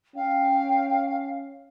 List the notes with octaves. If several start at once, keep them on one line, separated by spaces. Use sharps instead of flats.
C#4 F5 G5